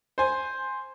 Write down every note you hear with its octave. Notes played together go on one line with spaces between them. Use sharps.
C5 G#5